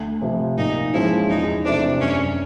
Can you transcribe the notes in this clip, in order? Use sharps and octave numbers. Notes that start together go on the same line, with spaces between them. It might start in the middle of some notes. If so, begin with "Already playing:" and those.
Already playing: D2
C3 F3
A#2 D#4
F3 G#3 C#4 E4
E2 D#4
C3 E3 A3 C4 D4
F#2 C#4